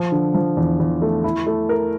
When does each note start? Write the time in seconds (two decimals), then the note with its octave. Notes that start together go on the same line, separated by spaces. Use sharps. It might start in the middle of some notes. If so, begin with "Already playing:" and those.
Already playing: F3
0.12 D3
0.34 F3
0.57 E2
0.79 E2
1.02 A3
1.24 E4
1.47 A3
1.69 A#4